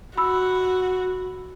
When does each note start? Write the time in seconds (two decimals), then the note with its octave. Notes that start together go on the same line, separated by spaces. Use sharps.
0.17 F#4 B5 E6